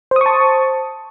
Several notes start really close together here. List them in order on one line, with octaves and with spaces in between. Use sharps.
C5 D#6 C#6 A5